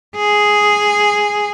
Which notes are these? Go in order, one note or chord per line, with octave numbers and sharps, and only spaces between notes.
G#4